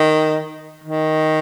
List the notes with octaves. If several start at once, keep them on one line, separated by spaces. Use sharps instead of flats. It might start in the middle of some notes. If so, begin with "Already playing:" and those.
Already playing: D#3
D#3